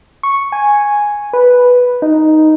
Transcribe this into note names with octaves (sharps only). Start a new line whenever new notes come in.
C#6
G#5
B4
D#4